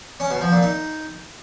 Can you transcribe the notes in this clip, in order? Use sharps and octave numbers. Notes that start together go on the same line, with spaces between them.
C#4
B2
F3
A#2
D#4